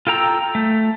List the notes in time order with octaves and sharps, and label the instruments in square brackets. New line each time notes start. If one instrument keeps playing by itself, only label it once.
[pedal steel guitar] F4 A4 G5 A#5 E6
A3